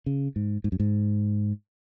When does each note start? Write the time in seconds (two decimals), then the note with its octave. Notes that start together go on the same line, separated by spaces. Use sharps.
0.06 C#3
0.36 G#2
0.64 G#2
0.72 F#2
0.80 G#2